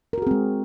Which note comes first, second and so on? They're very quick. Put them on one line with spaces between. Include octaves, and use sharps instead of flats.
A#4 F#4 G#4 C4 G#3